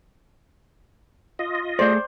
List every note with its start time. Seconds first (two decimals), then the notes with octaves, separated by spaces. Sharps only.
1.39 F4 D#5
1.79 A3 G#4 A4 C5 D5